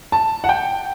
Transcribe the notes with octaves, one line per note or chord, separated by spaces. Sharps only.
A5
F#5
G5